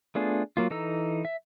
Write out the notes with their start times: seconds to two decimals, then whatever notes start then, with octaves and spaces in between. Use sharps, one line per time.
0.15 A3 B3 D4 F4 G#4
0.57 F#3 A#3 F4
0.70 E3 D#4 A4 A#5 E6
1.25 E5